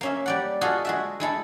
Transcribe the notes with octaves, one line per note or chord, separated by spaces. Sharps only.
A#3 C#4 E5
G3 D5 F#5
F4 F#4 G#4 A4 D#5
G#3 F#4 E5
G#3 E4 A4